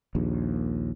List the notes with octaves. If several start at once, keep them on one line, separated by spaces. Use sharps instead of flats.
A#1 D#2